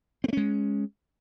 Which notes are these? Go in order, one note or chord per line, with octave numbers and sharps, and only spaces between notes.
G#3 A3 C4 C#4